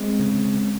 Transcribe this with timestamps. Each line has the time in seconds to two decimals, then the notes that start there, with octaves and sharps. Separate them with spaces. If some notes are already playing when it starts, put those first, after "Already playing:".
Already playing: G#3 C4
0.20 C#3